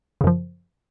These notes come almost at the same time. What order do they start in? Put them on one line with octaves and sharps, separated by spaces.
C#3 F#2 F3